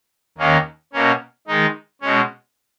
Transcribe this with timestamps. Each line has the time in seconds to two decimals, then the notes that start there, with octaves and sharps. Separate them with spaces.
0.38 D#2 D#3 A#3 C#4
0.93 B2 A#3 C#4
1.47 D#3 G#3 D#4
2.01 B2 G#3 C#4